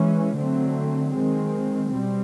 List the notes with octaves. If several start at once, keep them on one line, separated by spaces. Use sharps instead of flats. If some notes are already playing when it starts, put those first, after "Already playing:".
Already playing: E3 G#3 C#4
D3 F#3 A3 C4
D#3 G#3 C4
B2 G3 C4